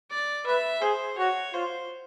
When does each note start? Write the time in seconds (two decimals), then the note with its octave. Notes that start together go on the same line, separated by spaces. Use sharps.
0.10 D5
0.46 B4 E5
0.81 G#4 C5
1.18 F#4 C#5
1.54 F4 C5